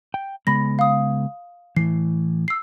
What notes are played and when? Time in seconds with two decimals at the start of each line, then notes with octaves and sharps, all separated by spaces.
0.14 G5
0.47 C#3 G#3 B3 B5 A#6
0.79 F5 D#6
1.77 A2 E3 C7
2.48 E6 C7